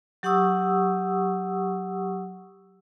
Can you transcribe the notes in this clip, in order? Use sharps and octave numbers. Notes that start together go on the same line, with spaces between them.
F#3 G4 F#5 C#6 D#6 E6